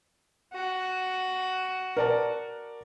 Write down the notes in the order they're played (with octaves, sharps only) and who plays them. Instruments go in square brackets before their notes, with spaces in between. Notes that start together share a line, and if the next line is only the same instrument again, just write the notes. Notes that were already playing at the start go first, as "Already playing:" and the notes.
[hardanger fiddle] F#4
[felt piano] A#4 D5 A5